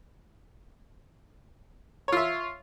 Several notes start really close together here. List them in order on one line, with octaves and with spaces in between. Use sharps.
C#5 F4 E5